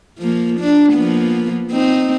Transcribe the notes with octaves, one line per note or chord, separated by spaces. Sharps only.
F3 A#3
D4
F3 A#3 B3
C4 D#4